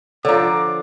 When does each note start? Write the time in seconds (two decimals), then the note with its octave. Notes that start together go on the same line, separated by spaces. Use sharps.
0.25 D3 F3 C#5 D5 A#5 D6